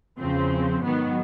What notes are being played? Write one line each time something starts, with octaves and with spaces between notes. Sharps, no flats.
E2 C#3 F3 C4
G#2 D#3 F#3 B3